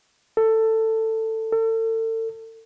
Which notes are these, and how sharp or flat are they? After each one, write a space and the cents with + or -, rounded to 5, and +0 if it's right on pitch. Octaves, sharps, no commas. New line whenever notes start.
A4 +15
A4 +35